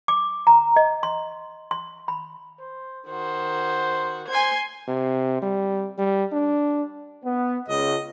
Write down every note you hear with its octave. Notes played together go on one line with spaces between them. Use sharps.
D6
A#5
D#5
C6
C6
B5
C5
D#3 F#4 C5
C5 G#5 C6 G#6
C3
G3
G3
D4
B3
C#2 D#5